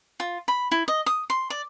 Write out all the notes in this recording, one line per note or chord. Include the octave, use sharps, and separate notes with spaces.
F4
B5
E4
D#5
D#6
C6
D5